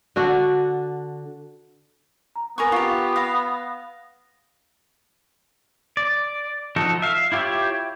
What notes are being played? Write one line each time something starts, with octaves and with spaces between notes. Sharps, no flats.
D3 D4 F#4
A#5
B3 A#4 G#5 C#6
F4 G4 C#6
F5 F#5 A#6
D5
F3 D#4 F#4 A4
E5 F5
E4 F4 G4 C#5 E5